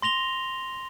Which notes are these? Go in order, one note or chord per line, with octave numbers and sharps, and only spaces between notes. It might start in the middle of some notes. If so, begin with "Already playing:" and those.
C6 A#6 F7 G7